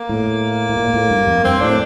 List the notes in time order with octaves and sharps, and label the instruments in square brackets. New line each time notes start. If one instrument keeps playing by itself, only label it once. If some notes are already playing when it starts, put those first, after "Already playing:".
Already playing: [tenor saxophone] A#3
[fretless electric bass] A2
A2
A#2
A2
G2
F2
[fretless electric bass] G2 [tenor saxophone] C4
[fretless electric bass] A2 [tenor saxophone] D4